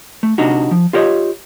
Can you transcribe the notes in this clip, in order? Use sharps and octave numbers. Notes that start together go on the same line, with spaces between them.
A3
C3 D4 D#4 F#4
F3
F4 G4 A#4 C#5 D#5